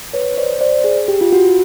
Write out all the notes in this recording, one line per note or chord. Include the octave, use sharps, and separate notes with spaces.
B4 C#5
C5 D5
C5 D5
G#4
G4
F4
F#4